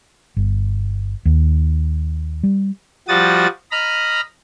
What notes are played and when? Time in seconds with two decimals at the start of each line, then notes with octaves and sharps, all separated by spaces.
0.36 G1
1.25 D#2
2.43 G3
3.08 F3 G3 F#4 D#6 A6
3.72 D#5 A#5 B5 F6